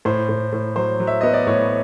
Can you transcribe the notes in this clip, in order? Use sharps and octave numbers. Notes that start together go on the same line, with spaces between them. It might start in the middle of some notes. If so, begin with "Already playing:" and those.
A2 C5
A2
A2
F#3 C5
F#3
E5
B3 D#5
D5
A2 C#5